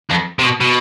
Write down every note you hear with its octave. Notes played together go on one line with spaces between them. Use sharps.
F2
C3
B2
B2